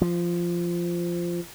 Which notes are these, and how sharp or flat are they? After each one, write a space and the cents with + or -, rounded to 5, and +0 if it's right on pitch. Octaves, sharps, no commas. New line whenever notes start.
F3 -10